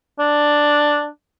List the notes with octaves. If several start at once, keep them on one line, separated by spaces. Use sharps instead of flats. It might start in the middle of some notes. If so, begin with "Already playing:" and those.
D4